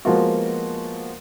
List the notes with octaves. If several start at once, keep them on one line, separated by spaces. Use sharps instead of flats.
F3 G#3 A#3 B3 F4 F#4